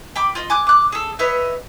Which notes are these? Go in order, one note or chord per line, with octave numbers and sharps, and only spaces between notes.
G5 B5 D6
F4 D#5
G#5 D6 F#6
D6 F#6
G#4 A4
B4 C#5 D#5 E5